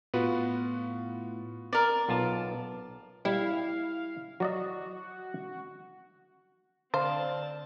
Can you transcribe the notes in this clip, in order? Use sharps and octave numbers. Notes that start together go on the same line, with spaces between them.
A2 B3 F4 F#4 B4
A#4 D5
B1 B3 F4 A5
G3 E4 F5
F#3 F#4 D5 D#5
D3 C4 C5 D5 F5 A5